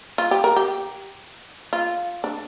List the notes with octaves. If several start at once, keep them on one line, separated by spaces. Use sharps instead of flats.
F4
G4
A#4
G4
F4
D4